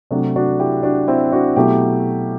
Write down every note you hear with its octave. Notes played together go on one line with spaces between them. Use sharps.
C3 F#3 A3 D4
D4 F#4
E4 G4
D4 F#4
C4 E4
D4 F#4
B2 F#3 A3 E4 G4